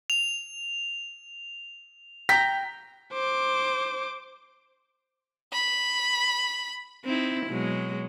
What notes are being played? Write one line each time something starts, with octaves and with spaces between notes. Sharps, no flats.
F7
G5 A#5 B6
C5 D6
B5
C4 D#4 E4
B2 F#3 G#3